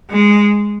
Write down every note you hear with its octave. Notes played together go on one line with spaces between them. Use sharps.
G#3